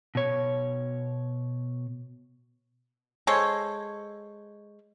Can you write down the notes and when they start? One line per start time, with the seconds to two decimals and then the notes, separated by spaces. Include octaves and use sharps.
0.15 B2 C#5
3.27 G#3 A4 C5 C#5